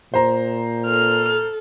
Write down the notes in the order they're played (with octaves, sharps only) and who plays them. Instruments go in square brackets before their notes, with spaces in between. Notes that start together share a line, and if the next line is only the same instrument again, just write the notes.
[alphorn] A#2 [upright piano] C5 A#5
[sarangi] A4 [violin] F6